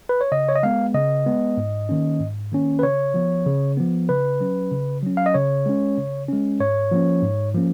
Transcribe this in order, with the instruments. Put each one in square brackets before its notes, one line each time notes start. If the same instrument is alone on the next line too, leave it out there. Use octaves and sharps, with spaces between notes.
[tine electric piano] B4
C#5
C#3 D#5
C#5
D#5
G#3 B3 F5
C#3 D#5
G#3 B3
G#2
D#3 A#3 C#4
G#2
D#3 A#3 C#4
B4
C#3 C#5
F3 B3
C#3
F3 B3
C#3 B4
F#3 C#4
C#3
F#3 C#4
F5
D#5
C#3 C#5
G#3 C#4
C#3
G#3 C#4
G#2 C#5
F3 A#3 C#4
G#2
F3 A#3 C#4